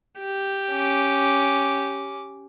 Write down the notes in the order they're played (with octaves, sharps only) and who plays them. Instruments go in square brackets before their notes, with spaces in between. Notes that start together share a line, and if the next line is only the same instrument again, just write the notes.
[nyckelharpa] G4
[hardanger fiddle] C#4 D6